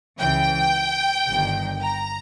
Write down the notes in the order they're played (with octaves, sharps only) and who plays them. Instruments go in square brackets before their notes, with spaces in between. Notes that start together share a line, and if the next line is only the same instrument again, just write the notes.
[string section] C#2 C#3 E3 G5
G1 G2 D#3
A#5